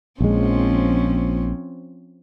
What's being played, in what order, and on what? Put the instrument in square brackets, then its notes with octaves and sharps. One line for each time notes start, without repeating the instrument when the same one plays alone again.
[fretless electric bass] A#1 G#3 [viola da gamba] F3 C4 C#4